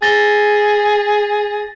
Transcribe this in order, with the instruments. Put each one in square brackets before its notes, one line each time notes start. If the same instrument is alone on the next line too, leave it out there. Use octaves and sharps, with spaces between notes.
[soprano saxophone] G#4 [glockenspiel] A6 A#6 G7